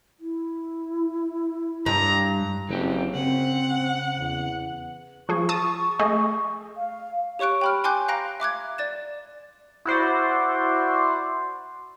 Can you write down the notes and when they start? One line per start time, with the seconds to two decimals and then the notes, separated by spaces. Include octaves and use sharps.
0.20 E4
1.86 G2 A#5
2.69 F#1 E3 C4 G4
3.15 C#3 C4 F#5
4.18 E2
5.29 F3 G#4 C#6
5.49 A5 D#6
5.99 A3 G#4 D#5
6.77 F5
7.39 G4 C#5 C#6 F#6 D7
7.61 G5 B5 F6
7.84 G5 G#5 C6 D6 F#6 G6
8.08 F5 A#5 F#6 A#6 D7
8.40 E5 D6 F#6 G#6
8.78 D5 A6 E7
9.85 E4 F#4 C5 D5